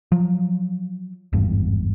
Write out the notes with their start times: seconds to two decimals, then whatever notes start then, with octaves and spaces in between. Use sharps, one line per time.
0.12 F3 F#3
1.33 G#1 E2 G2